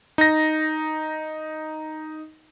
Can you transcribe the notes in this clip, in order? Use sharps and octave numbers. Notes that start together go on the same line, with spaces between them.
D#4 A#6